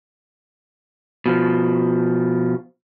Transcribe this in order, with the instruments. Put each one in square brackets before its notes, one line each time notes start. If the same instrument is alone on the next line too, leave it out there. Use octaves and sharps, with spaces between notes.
[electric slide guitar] B2 F3